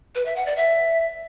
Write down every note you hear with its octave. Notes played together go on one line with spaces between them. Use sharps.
B4
E5
F#5
D5
E5